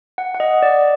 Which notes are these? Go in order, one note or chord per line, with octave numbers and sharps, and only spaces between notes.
F#5
F#5
D#5
D5